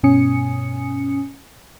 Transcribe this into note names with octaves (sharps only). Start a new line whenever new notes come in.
G2 B2 C#4 G#5 D#6 C#7